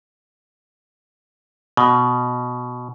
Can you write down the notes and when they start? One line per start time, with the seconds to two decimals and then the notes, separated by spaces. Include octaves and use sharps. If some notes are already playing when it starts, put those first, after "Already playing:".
1.77 B2